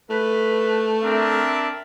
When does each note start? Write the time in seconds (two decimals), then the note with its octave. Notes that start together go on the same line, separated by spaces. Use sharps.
0.10 A3 B4
1.03 C4 D4 A#4 E5